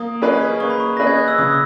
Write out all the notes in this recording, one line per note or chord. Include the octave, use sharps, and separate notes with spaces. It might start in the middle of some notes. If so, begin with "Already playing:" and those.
Already playing: A#3 D#6
C#4 G#4 B4 D#5
A#3 C#6
B5
C#6
C#4 G#4 B4 D#5 A#6
G#6
F#6
E6
C#3 D#6